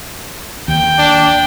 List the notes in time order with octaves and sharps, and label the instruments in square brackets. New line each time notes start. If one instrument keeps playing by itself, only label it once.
[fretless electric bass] D#2 [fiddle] G5
[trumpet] D4